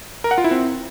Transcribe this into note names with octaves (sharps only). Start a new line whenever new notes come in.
A#4
F#5
F4
E4
C4